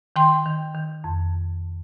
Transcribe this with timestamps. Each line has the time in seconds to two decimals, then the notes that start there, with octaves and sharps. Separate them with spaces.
0.16 D#3 G5 C6
0.46 D#3
0.74 D#3
1.04 F2